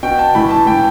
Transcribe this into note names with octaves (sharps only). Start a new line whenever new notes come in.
B2 G5
A5
A2 E3 B5
A5
A2 E3 G5